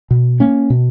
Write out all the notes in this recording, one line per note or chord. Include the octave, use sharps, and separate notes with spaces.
B2
A#3 C#4
B2